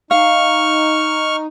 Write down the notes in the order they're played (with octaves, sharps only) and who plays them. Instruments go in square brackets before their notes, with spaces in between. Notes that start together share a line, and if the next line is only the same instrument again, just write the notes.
[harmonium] D#4 [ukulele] F5 [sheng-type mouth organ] C#6 F6